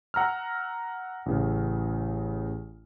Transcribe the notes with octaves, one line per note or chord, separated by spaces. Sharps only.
F#5 A#5 E6 F6
A1 C#3